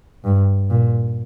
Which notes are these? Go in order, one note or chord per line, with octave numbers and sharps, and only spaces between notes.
G2
A#2